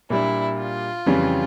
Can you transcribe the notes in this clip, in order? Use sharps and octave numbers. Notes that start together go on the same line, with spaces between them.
A#2 G3 D4 E4
F4
F2 C#3 E3 G3 C#4